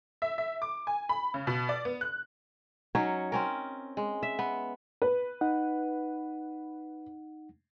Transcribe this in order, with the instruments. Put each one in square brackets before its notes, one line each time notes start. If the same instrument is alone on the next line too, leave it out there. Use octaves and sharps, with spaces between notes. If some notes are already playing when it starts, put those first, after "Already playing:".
[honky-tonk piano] E5
E5
D6
G#5
B5
C#3
B2
D5
B3
F#6
[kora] F#3 C#4 D#4 C#5
C4 C#4 A#4
G#3
E5
B3
[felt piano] B4
[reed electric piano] D#4 F#5